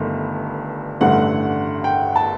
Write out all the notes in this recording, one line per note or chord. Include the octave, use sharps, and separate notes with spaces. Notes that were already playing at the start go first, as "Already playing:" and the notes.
Already playing: G1 G2 D#3 A3
A1 G2 D3 A3 F#5
G5
A5